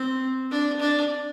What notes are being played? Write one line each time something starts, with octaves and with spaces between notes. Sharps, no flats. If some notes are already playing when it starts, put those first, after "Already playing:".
Already playing: C4
D4
D4